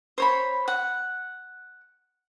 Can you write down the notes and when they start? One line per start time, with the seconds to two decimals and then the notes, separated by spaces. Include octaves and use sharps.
0.18 C5 C#5 B5
0.68 F#5